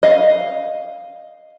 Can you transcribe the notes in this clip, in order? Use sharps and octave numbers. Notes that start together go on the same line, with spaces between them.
D#5 F5